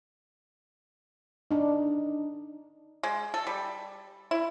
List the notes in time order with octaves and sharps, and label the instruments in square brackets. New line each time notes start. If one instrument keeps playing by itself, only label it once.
[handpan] D4 D#4
[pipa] G#3
A4
G3
E4